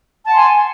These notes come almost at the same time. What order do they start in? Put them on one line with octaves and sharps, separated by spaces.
A5 F#5 C6 G#5